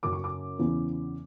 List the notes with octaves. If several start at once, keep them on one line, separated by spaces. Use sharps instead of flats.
F#1 F#2 C#3 F#3 D6
C#6
D6
E2 C#3 E3 B3